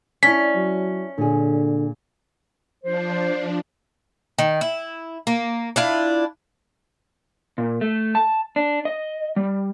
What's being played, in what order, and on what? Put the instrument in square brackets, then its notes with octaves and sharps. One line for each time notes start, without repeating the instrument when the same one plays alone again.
[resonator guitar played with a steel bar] C#4 [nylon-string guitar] D4 E4 [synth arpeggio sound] B6
[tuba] F#3
[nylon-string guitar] A#2 G#4 [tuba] D3
[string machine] F3 D4 [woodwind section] C5
[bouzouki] D#3
E4
A#3
D4 E4 F4
[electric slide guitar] A#2
A3
A5
D4
D#5
G3